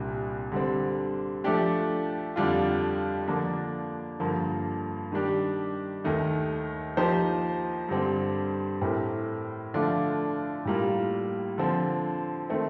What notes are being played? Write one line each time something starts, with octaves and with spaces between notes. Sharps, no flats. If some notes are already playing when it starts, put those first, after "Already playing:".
Already playing: C2 A#2 G3 D4
D3 G3 C4
F3 A3 D4 G4
F2 D3 G3 D4 F4
D3 F3 A#3 D4
G2 D3 F3 A#3
D#3 G3 D4 G4
D#2 D#3 A3
F3 A#3 D#4 G4 C5
G2 D3 G3 C4
A2 A3 C4 G4 A#4
D3 F3 A3 D4 F4
A2 G3 A#3 F4
D3 F3 C4
D#3 A3 C4